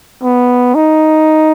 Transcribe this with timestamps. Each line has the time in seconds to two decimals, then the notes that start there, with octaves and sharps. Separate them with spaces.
0.23 B3
0.75 D#4